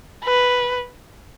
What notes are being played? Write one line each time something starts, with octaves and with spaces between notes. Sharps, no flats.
B4